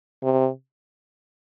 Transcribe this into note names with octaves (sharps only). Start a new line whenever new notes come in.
C3